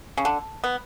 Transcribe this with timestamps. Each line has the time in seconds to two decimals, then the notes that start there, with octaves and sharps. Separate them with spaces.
0.17 C#3
0.25 D3
0.64 B3